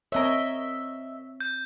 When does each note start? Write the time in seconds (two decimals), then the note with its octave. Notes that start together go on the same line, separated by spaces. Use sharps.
0.12 C4 A#4 C#5 D#5 E5
1.40 G6